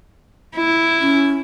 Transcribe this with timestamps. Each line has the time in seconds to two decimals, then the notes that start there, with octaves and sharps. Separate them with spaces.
0.56 E4
1.01 C#4